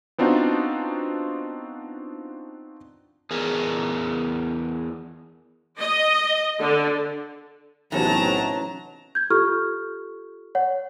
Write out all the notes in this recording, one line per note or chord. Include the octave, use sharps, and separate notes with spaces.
B3 C4 D4 D#4 F4 F#4
E2 G#4 A#4
D#5
D3
B1 A2 C3 E3 F#3 C#4 A5 A#5
G6 G#6
F4 G4 A4 C#6 F6
C#5 F#5